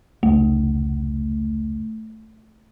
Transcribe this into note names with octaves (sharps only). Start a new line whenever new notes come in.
F1 C#2 A3